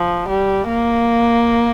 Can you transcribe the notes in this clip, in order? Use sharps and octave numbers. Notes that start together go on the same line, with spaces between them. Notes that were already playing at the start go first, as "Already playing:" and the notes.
Already playing: F3
G3
A#3